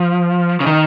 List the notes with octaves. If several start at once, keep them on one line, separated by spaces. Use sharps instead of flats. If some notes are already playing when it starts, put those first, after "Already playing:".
Already playing: F3
C#3
D#3